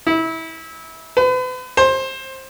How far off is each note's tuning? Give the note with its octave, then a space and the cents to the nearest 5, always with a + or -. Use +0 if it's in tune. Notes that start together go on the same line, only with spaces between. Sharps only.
E4 -25
B4 +40
C5 +20